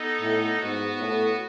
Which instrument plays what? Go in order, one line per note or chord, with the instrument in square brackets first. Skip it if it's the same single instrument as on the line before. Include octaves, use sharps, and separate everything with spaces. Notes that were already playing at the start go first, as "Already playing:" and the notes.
Already playing: [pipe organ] B3 D#4 A4 D#5
[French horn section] A2
[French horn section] G#2 [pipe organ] B3 F#4 B4
[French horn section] A2